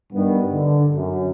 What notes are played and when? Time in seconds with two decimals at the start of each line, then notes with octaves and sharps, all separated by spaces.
0.13 G2 D#3 B3
0.52 D3
0.94 F#2